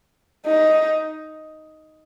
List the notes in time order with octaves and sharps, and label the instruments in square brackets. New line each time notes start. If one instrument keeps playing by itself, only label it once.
[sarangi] D#4